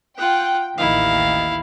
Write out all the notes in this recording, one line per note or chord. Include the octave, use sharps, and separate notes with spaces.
F4 F#5 G5
A1 D#2 D#3 E4 F5